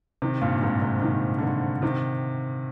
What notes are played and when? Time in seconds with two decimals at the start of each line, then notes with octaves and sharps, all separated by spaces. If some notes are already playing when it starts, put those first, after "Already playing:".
0.22 C3 D#3
0.42 G2 A#2
0.58 A#2
0.62 G#2 C3
0.82 G#2 C3
1.02 C3 D#3
1.38 D3
1.43 C3 D#3
1.82 C3 D#3